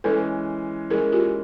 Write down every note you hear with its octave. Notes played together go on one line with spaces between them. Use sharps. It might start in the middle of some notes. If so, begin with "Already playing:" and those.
E3 G#3 C#4 A4 B4
E3 G#3 C#4 G#4 A#4
F4 G4